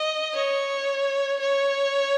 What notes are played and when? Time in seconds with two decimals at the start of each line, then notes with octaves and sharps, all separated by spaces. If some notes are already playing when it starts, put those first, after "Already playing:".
Already playing: D#5
0.34 C#5
1.40 C#5